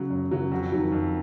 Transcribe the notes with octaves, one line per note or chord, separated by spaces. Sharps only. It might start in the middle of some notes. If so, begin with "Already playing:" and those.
Already playing: C#3 F#3
F#2
C#3 F#3
F2 F#4
D#3 F#3
F2